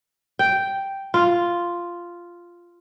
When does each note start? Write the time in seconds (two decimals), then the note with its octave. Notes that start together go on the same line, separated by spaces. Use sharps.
0.39 G5
1.14 F4